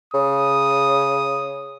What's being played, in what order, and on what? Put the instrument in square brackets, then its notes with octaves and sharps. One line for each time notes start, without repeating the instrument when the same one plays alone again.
[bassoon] C#3 [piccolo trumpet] D#6